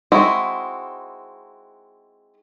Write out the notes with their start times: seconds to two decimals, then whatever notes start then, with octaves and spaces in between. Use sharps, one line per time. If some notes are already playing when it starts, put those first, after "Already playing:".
0.12 G#3 C4 D#4 E4 F#4